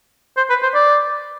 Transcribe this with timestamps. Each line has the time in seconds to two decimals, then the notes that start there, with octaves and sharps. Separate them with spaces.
0.37 C5
0.50 B4
0.62 C5
0.74 D5